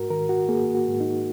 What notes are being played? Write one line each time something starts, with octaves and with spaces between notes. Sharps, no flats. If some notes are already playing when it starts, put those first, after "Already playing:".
Already playing: G#2 F#4 A#4
D#3 A#4
F#4
A#3 G#4
F#4
G#2
D#4